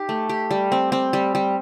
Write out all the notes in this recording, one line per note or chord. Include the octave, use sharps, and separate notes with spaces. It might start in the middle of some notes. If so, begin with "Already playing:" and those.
Already playing: D#4 G4
A3
G4
G3
C4
C4
G3
G3